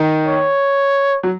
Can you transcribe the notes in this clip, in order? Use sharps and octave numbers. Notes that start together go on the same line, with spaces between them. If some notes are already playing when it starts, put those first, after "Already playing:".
Already playing: D#3
C#5
F#3